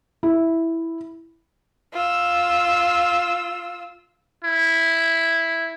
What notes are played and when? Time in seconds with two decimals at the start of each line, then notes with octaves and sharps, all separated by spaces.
0.23 E4
1.94 F4 E6
4.44 E4